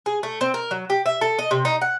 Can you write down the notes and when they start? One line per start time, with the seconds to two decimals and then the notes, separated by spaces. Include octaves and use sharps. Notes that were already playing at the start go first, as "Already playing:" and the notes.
0.06 G#4
0.23 A3
0.41 C4
0.54 A#4
0.71 F#3
0.90 G4
1.06 E5
1.21 A4
1.39 D#5
1.51 C3
1.65 D#4
1.81 F#5